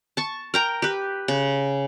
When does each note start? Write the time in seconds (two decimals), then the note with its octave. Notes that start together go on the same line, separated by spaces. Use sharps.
0.17 A5 C#6
0.54 A#4 G5 A#5
0.82 G4 B4
1.28 C#3